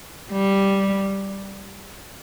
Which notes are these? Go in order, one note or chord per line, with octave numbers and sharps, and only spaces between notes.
G3